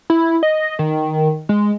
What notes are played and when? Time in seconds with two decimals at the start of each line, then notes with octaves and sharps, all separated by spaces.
0.10 E4
0.43 D#5
0.79 D#3
1.49 G#3